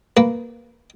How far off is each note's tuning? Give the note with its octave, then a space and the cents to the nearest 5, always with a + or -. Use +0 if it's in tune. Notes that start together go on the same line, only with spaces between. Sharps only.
A#3 +0 B4 +0